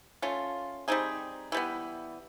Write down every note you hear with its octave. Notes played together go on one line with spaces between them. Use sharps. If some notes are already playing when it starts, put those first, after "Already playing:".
A3 C#4 F4
G3 C4 D#4 G#4
E3 G3 B3